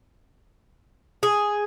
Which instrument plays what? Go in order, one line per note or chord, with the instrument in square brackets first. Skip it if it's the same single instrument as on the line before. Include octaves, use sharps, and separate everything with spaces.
[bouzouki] G#4